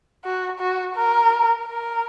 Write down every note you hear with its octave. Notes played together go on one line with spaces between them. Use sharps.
F#4
F#4
A#4
A#4